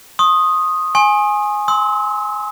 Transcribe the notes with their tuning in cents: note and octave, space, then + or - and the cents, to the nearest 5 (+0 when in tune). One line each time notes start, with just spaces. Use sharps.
C6 +45 D#6 +0
G#5 +5 C6 +45
C6 +0 E6 -40